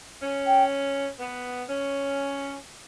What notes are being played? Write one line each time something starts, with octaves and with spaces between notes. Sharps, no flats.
C#4
G5
B3
C#4